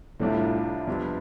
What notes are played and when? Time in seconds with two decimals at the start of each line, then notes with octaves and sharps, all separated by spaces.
0.20 C2 A2 C3 G3 D4 F4
0.87 F2 C3 G3 B3 D4